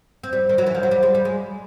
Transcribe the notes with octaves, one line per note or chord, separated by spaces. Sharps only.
C4
G3
D#3
F#3
E3
F3
F#3
G3
G#3
G3
G#3